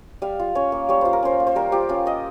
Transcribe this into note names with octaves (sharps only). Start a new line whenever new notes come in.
G3 F5
F4
C#4 C#5
A#3
G3 C#5
F4 C5
A#4
C#4 C5
A#3
C5
G3 A#4
F4 G4
C#4 F4
A#3 D#5